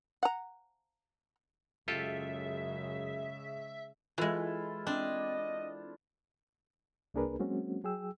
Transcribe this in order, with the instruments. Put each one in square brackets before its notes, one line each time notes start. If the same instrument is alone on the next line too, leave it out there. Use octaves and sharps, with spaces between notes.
[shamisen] F#5 A#5
[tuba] F#2 [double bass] C#3 G#3 [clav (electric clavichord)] F4 G4 A4 [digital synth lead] E5
[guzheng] E3 G#3 [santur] E4 F4 A4
[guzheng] C4 [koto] D4 [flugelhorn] D#5
[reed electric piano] C2 A#3 D4 G#4 A#4 B4
F#3 G#3 A#3 C4 C#4 F#4
F#3 G#4 G5 E6